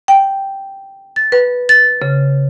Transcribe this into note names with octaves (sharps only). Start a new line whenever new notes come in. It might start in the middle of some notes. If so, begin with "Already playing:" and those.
G5
A6
B4
A6
C#3